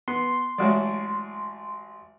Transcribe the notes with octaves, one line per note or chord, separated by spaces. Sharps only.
B3 C6
A1 F#3 G#3 F#4 C#5 D5